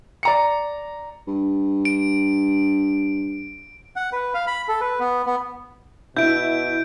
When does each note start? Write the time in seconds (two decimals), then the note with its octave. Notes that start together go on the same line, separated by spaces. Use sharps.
0.23 D5 A#5 C#7
1.28 G2
1.85 D7
3.96 F#5
4.12 B4
4.34 F5
4.47 B5
4.68 A4
4.81 B4
5.00 B3
5.26 B3
6.17 B2 E4 G6 D7